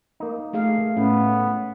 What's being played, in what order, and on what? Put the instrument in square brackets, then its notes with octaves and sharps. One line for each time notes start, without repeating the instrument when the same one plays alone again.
[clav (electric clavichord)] A#3 D#4
[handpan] A3 G#4 F5
[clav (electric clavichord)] A2 [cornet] B3 [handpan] C#4